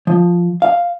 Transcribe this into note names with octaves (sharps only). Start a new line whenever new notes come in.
F3
F5